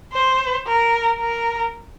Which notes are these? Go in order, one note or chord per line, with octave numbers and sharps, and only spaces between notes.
C5
A#4
A#4